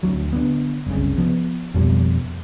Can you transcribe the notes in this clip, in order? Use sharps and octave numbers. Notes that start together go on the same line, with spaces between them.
D2 F#3
D3 B3
F#1 C2 C#3
F3 B3
F2 B2 F3 G3